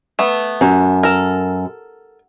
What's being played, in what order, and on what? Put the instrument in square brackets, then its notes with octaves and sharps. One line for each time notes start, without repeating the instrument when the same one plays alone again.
[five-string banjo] A3 B3
[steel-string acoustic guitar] F#2
[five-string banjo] A4 A#4